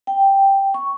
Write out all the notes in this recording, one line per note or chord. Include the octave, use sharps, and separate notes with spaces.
G5
C#6